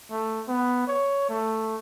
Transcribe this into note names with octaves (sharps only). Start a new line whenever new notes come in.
A3
B3
C#5
A3